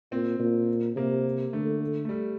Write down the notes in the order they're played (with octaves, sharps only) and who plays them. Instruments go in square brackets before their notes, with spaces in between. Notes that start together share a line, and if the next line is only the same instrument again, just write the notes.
[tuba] A#2 [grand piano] C4
[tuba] A#2
[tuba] C3 [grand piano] A#3
[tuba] D3 [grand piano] A3
[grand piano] A3
G3